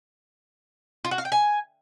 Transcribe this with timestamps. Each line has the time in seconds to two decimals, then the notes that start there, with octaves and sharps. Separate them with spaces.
1.05 F4
1.11 F#4
1.18 F5
1.25 G5
1.32 G#5